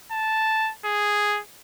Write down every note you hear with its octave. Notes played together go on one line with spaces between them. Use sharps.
A5
G#4